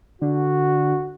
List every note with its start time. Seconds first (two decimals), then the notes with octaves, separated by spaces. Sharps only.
0.21 D3 F#4